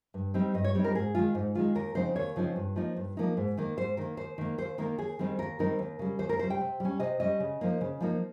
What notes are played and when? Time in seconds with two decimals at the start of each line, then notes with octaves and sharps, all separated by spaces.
0.14 G2
0.34 G3 C4 D#4
0.54 G2 D#5
0.64 C#5
0.75 G3 C4 D#4
0.84 A#4
0.95 G#2 G#4
1.15 D#3 G#3 D#4 F4
1.35 G#2 D#4
1.55 D#3 G#3 D#4 F4
1.75 D#2 A#4
1.95 C#3 F3 C4 D#4 C5
2.16 D#2 C#5
2.36 C#3 F3 C4 D#4
2.56 G2
2.76 F3 A#3 D#4
2.96 G2
3.17 F3 A#3 D#4
3.37 G#2
3.57 D#3 A#3
3.77 G#2 C5
3.97 D#3 A#3 A#4
4.17 D#2 C5
4.38 D#3 A#3
4.58 D#2 C5
4.78 D#3 A#3 A#4
4.98 D#2 G#4
5.19 D#3 G3 C4 D#4
5.39 D#2 A#4
5.59 D#3 G3 C4 D#4 A#4
5.79 D#2
5.99 C#3 G3
6.19 D#2 C5
6.29 A#4
6.39 C#3 G3 C5
6.50 G5
6.60 C3
6.80 G3 C#4
7.00 C3 D#5
7.20 G3 C#4 D#5
7.40 C#3
7.61 F3 A#3 D#4
7.81 C#3
8.00 F3 A#3 D#4